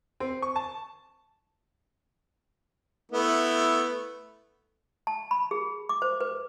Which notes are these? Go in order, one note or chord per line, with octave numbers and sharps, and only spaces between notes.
C4
C#6
A5
A3 B3 E4
A5
B5
G#4
D6
C5
B4